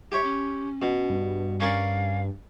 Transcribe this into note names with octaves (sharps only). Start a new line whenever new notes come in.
G4 C#5 E5
C#4
B2
G2
C#4 A#4 D5 F5